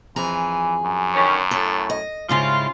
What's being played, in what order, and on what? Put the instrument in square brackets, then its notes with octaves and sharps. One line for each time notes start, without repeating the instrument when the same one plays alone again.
[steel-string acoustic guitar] F2 G#4 A#5 [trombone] E3
[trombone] F#2
[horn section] D3 D#3 C#4
[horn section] A2 [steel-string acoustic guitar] A4
[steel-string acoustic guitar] D#5
[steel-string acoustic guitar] G#2 C#3 E4 [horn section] G3 C#4 F4